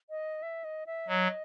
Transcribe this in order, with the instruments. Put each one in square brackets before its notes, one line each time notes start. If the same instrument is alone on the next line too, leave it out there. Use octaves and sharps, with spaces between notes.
[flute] D#5
E5
D#5
E5
[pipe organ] F#3 [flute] D#5